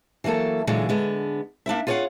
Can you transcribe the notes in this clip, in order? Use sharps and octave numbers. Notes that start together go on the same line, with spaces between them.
E3 F#3 G3 A#3 A4
A#2 D3 E3 F#3 G#3
D3 G#3 B3
A#3 D4 E4 E5
F4 G#4 C#5 D5 F5 F#5